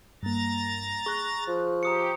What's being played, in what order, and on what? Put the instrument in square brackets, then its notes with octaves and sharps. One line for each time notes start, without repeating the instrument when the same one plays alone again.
[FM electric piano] G2 A#3 [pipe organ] A#5 A6
[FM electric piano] G#4 F#6 [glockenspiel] C#6
[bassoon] F3
[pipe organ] G4 [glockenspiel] A#5 D#6 C#7